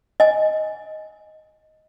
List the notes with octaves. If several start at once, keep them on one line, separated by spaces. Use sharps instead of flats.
D#5 G#5